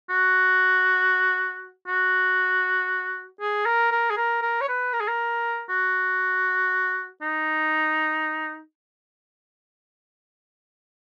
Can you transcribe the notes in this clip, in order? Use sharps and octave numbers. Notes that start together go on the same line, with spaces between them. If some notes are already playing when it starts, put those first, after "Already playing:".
F#4
F#4
G#4
A#4
A#4
G#4
A#4
A#4
C#5
B4
A#4
G#4
A#4
F#4
D#4